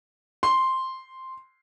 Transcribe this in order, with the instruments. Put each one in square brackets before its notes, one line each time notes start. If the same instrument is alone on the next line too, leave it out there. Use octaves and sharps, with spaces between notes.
[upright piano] C6